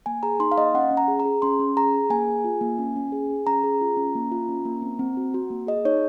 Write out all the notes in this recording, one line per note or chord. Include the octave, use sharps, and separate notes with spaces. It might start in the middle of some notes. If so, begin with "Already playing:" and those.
A#3 G#5
G#4 A#5
D#4 C6
F5
A#3 D#5
C#4 F#5
C#4
A#5
G#4
A#5
G#4
C#4 C6
C#4
G#4 A#5
G#4
A#3 G#5
G#4
F4
A#3
C#4
C#4
G#4
G#4
C#4 A#5
G#4
F4
C#4
A#3
F4
C#4
A#3
C4
C4
F#4
F#4
A#3
G#4 D#5
D#4 C#5